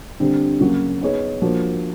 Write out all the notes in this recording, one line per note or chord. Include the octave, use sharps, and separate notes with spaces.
D3 G3 C4
C#3 F#3 A#3 C#4 F#4
B3 D#4 G#4 C#5
F3 A#3 D4 F#4